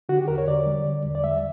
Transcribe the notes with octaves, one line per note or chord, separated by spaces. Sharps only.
D3 F#4
G4
E2 A#4
C#5
D3 D5
G3
D3
E2
D5
G3 E5